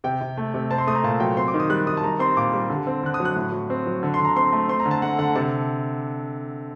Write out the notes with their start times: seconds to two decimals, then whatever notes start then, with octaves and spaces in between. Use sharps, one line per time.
0.04 C3 G5
0.21 C3
0.37 A3
0.54 C3
0.71 C4 A5
0.78 C6
0.87 A3 D#6
0.95 A#5
1.03 A#2 A5
1.20 F#3 G5
1.37 C4 C6
1.48 D6
1.54 D#3
1.60 D#6
1.70 G3 F#6
1.87 D#3 D#6
1.97 A5
2.04 G3 A#5
2.19 C4 C6
2.37 A#2 D6
2.54 G3
2.69 D3
2.87 C4
3.04 D3 F#6
3.14 D#6
3.20 F#3
3.25 F#6
3.36 A2
3.52 F#3
3.70 C4
3.87 F#3
4.03 D3
4.14 C6
4.20 D3
4.25 A#5
4.36 C4 C6
4.53 A3
4.68 C4 C6
4.80 A#5
4.85 D3
4.91 A5
5.02 A3 F#5
5.18 D3 F#5
5.35 C3 A5